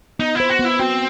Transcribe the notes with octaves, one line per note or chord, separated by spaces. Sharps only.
B3 D#4
E4
C5
F#4
B3
E4
C4 F#4